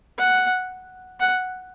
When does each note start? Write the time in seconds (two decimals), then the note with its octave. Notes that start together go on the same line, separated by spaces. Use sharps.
0.18 F#5
1.20 F#5